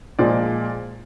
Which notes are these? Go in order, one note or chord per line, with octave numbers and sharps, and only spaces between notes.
A#2 F3 G#3 D5